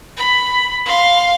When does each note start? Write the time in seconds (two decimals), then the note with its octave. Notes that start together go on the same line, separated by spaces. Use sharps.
0.17 B5
0.85 F5 C6